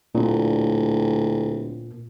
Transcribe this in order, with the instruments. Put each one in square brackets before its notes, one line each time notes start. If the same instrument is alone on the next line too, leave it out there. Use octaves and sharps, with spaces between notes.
[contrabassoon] D1 [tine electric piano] A#2